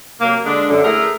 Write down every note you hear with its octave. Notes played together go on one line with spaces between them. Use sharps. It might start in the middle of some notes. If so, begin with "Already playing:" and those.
C3 F#3 A#3
D3 G#3 D4
F#2 D3
A3 E4 G#4 A#4